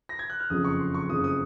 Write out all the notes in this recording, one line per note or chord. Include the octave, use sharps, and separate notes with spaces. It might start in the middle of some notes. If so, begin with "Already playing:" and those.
A#6
G#6
F#6
F6
F#1 F2 C#3 F3 D#6
C#6
C6
C#6
F#1 F2 C#3 F3 D#6
D#6